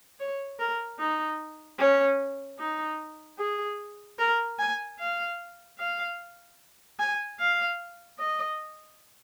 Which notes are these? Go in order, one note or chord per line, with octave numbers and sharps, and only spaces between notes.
C#5
A#4
D#4
C#4
D#4
G#4
A#4
G#5
F5
F5
G#5
F5
D#5